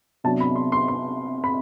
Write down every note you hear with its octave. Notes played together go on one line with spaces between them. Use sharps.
C3 F#3 B3 D4 A5
B5
C6
C6
C6
B5